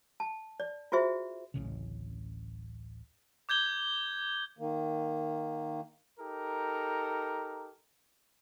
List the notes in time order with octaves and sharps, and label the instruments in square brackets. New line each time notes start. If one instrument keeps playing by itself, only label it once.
[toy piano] A5
D5
F4 F#4 G#4 C5 E5
[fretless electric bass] D1 A1 C#3
[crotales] D6 G6 G#6 G7
[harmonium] D#3 A#3
[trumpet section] D#4 G4 A4 A#4